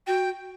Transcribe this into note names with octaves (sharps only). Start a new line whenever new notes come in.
F#4 G5